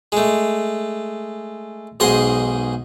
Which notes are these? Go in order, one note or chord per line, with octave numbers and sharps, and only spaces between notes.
G#3 A3
B1 G#2 G#4 D#5 C6